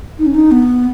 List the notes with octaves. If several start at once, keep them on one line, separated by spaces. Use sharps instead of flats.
D#4
C#4
D#4
B3